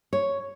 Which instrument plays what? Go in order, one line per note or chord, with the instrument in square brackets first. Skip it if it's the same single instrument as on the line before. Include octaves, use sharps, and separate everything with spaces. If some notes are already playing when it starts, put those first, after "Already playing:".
[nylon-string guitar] C#5